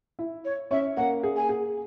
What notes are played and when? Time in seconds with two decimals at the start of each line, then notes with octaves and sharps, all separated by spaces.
0.19 E4 E5
0.45 C#5
0.71 C#4 C#5 E5
0.97 A#3 A#4 F#5
1.23 G#4
1.36 G#5
1.49 G#4